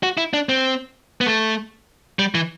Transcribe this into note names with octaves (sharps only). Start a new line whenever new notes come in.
F#4
E4
D4
C4
B3
A3
G3
E3